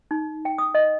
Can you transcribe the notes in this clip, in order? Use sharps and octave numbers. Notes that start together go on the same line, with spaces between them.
D#4
G5
D#6
D#5